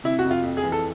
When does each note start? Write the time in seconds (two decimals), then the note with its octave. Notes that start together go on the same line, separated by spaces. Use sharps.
0.04 C3 E4
0.19 F#4
0.25 F2
0.31 F4
0.43 F2
0.57 G#4
0.63 E3
0.72 A4